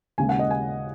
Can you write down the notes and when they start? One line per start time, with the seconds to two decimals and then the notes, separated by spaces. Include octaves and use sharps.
0.18 D#2 C#3 G#3 G#5
0.29 F#5
0.39 D#5
0.51 G#5